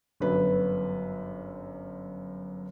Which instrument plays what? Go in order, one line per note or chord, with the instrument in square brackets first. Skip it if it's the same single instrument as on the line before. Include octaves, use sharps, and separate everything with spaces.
[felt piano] G1 F#2 B4